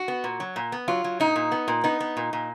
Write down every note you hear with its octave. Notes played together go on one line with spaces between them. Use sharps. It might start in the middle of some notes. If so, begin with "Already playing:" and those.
Already playing: F#4
B3
A#2
F#3
A#2
B3
F#3 F4
F#3
A#2 D#4
A#2
B3
A#2
B3 D#4
B3
A#2
A#2